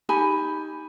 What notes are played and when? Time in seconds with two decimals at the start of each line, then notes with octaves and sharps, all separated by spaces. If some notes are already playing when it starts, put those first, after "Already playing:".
0.09 D#4 G4 G#5 B5